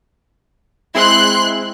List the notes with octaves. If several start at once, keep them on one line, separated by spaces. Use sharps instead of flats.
G#3 C4 E4 C6 F#6